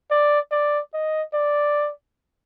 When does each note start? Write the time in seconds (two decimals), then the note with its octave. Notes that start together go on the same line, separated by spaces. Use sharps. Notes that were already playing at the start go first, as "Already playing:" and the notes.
0.11 D5
0.52 D5
0.94 D#5
1.34 D5